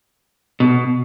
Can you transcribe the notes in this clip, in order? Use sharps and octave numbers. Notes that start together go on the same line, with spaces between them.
B2